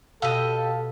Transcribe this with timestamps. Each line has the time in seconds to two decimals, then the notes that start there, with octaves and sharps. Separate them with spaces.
0.22 B2 G4 A4 D#5 F5 E6